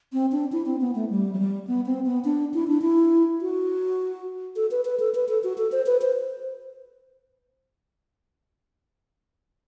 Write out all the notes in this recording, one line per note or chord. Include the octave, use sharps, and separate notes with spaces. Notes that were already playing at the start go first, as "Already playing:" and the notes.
C4
D4
E4
C4
B3
A3
G3
F#3
G3
B3
C4
B3
D4
E4
D4
E4
F#4
A4
B4
B4
A4
B4
A4
F#4
A4
C5
B4
C5